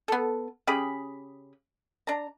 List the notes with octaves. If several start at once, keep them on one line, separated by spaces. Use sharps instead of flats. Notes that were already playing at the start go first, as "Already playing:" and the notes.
B3 A4
C#3 G4 G#4 B5
D4 A#5